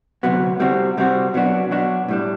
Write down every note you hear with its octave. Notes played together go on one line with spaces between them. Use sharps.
D2 C3 F#3 B3 F#4
C3 G3 C4 F#4
C3 G3 C4 F#4
B2 F#3 B3 D4 F#4
B2 F#3 B3 D4 F#4
A2 G3 D4